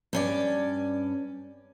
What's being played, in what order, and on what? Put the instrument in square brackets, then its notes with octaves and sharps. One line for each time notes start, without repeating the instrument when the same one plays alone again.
[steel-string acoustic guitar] G2 C#4 D5